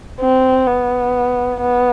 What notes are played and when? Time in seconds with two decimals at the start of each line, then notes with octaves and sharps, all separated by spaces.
0.20 C4
0.67 B3
1.61 B3